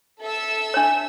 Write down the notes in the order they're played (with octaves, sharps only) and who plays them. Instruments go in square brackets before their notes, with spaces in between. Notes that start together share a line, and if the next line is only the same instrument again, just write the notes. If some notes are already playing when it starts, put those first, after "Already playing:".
[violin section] A4 E5 E6
[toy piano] D4 C#5